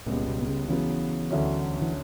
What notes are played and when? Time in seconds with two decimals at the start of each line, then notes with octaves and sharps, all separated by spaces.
0.06 C#2 A#2 C#3 G3 B3
0.27 B2
0.42 B2
0.48 C#3
0.68 C#3 E3 F#3 B3
1.30 D2 D3 F#3 C#4 E4
1.82 E3